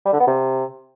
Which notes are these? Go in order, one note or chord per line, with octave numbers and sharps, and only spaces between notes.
G3
D3
B3
C3